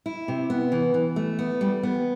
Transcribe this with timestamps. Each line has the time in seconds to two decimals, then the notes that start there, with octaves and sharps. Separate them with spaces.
0.06 E4
0.28 C3
0.50 B3
0.72 E3
0.94 E3
1.16 A3
1.39 B3
1.61 G3
1.83 B3